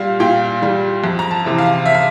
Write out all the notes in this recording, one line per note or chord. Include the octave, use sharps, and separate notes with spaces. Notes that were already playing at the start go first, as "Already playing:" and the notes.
Already playing: A#2 G3 F5
A#2 G5
G3
F2
A#5
A5
C3 E3
F5
E5
F5